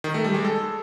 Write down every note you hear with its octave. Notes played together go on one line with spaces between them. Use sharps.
D#3
A3
G3
G#3
A4